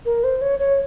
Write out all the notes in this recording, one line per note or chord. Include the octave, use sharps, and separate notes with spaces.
A#4
C5
C#5
C#5